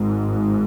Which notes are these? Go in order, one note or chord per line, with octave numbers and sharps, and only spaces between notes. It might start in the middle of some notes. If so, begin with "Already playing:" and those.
Already playing: G#1 G#2